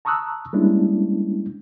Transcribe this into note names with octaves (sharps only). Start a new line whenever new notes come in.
A5 A#5 C#6 D#6 E6 F#6
G3 G#3 A#3 C#4 D4 E4